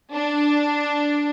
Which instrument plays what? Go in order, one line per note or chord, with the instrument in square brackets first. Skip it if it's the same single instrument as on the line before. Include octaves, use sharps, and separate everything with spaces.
[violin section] D4